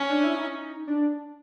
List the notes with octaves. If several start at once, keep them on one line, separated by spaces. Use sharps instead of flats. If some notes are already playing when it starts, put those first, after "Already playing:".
Already playing: C#4
D4
E4
D#4
D4